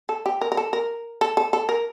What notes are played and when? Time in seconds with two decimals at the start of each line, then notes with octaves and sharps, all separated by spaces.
0.09 A4
0.26 G4
0.41 A#4
0.52 A#4
0.57 A4
0.73 A#4
1.21 A4
1.37 A4
1.53 A4
1.69 A#4